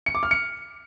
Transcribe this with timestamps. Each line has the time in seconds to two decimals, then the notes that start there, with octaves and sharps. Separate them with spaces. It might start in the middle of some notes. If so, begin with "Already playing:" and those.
0.06 C#7
0.15 D6
0.23 F6
0.31 C#7